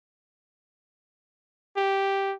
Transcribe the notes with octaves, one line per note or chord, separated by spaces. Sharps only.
G4